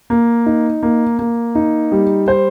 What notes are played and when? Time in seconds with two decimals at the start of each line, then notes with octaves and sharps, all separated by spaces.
0.10 A#3
0.46 D#4
0.83 A#3
1.19 A#3
1.55 D#4
1.92 G3
2.28 C5